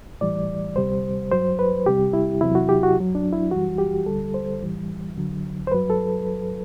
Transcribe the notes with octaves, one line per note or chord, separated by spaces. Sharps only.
A2 E3 G3 D5
D2 C3 G3 C5
G2 F#3 C5
B4
C2 C3 G3 G4
E4
E2 C3 F#3 E4
F#4
G4
F#4
F#2 F#3
D4
E4
F#2 E3 G3 F#4
G4
D2 D3 G3 A4
C5
A2 E3 G3
D2 D3 F#3
C5
G2 F#3 B4
A4